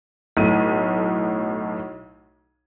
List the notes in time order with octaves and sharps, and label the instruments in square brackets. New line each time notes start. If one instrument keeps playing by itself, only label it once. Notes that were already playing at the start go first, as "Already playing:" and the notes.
[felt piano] B1 A2 D#7